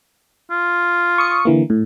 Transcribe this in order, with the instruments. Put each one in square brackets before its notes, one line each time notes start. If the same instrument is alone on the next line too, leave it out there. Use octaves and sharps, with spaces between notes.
[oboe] F4
[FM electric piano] C#6 D#6 C#7
D3 E3 A#3
A2